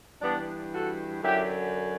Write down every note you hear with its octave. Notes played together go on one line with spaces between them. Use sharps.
G2 E3 B3 D4
F#4 A4
F#2 D3 F#3 E4 G4